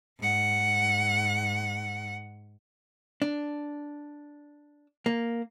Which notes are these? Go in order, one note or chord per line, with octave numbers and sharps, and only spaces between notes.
G#2 F#5
D4
A#3